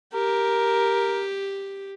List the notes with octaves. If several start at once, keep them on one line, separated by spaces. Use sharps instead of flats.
G4 A#4